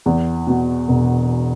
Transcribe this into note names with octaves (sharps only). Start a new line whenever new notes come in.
E2
B2
E1